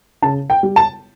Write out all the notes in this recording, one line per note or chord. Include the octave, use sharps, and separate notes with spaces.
C#3 A5
G5
G3
A5